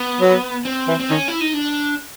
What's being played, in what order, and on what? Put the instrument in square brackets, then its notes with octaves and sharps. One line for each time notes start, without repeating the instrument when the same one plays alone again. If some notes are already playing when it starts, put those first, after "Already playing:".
Already playing: [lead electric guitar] B3
[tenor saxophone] F#3
[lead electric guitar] C4
[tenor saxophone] E3
[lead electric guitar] C4
[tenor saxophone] D#3 [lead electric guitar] C#4
[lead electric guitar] E4
D#4
D4